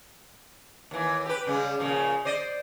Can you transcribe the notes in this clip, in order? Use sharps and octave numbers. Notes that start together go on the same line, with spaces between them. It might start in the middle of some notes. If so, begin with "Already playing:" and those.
D#2 E3
G4 B4
C#3 G3 G#3
A#2 C#3 F3
C5 D5 D#5